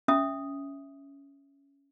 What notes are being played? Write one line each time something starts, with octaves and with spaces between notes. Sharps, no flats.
C#4 E5 D#6